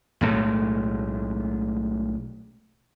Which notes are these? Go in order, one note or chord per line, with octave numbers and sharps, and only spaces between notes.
B1 A2 G#3 A3